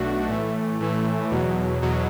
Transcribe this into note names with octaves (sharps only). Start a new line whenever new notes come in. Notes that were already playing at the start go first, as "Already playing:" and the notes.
Already playing: B1 B2 A3 D4 F#4
A2 E3 A3
A2 E3 A3
E2 B2 F#3
E2 B2 F#3